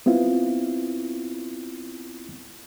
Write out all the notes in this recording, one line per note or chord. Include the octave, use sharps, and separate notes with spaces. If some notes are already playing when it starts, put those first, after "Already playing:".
B3 C4 E4 F4